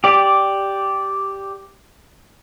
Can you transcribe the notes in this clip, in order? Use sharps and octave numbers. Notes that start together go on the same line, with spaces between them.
G4 D5